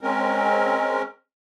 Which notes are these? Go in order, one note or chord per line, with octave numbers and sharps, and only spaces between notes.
G#3 C4 C#4 A#4